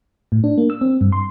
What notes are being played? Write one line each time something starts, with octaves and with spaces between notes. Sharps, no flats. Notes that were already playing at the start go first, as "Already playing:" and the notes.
A2
D4
A#3
E6
C4
G2
C6